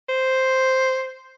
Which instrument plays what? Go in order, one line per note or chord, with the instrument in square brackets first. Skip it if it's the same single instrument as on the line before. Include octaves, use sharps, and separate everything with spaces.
[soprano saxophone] C5